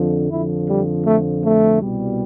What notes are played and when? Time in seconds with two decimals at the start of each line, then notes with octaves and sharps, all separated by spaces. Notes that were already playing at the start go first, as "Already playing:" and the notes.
Already playing: F2 D3 F3
0.30 F2 D3 F3 E4
0.68 G3
1.06 A3
1.44 A3
1.82 C2 B2 G3